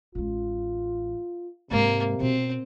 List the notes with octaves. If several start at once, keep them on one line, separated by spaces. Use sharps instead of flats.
A1 G#3 F4
G#2 C3 G#3 A#3
B2 C4